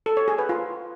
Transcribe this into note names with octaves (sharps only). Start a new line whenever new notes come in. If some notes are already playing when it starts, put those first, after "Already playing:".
A4
C#5
G#4
B4
F4